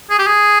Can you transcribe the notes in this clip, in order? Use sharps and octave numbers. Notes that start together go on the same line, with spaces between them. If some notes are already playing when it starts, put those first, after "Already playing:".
G#4
G4
G#4